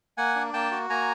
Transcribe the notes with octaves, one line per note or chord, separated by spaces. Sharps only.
A#3 F#5 G#5
D4
A#3 G5 A5
F#4
A#3 G#5 A#5